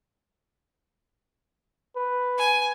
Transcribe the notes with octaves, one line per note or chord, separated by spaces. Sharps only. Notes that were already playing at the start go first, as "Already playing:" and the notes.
B4
G#5